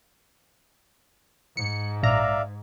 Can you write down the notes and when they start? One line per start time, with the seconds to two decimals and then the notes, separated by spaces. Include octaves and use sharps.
1.57 G#2 C#7
2.03 A#1 D5 E5 F5 A#5